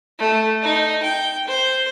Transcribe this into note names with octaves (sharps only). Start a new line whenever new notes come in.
A3
D#4
G5
C5